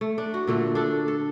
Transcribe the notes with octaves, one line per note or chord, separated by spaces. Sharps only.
A3
D4
F#4
A#2 D3 A3
D4 A4
A4